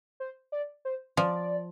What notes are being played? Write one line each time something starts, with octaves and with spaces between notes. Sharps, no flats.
C5
D5
C5
F3 D5